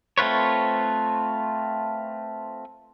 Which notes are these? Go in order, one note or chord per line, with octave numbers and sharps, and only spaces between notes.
A3 C4 F4 B4 C#5